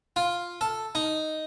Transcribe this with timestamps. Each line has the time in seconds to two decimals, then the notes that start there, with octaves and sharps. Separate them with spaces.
0.16 F4
0.61 A4
0.95 D#4